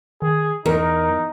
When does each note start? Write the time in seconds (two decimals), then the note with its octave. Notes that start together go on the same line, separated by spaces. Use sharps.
0.22 D#3 G#4
0.66 E2 E3 D#4 A#4